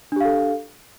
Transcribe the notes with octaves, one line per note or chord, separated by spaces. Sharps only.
D4 G4 A4 F5